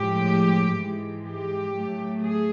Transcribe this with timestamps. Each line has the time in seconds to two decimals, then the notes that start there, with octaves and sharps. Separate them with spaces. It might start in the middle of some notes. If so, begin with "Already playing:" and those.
Already playing: A2 F3 G#3 G4
0.75 G#2 E3 G#3
1.24 G4
1.73 A2 F#3 A3
2.21 G#4